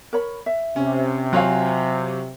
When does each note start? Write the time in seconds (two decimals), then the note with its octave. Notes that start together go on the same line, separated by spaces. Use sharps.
0.13 A#4 C#5 B5
0.46 E5
0.76 C3 C#4
1.33 F#3 F4 C5 C#5 F5 G#5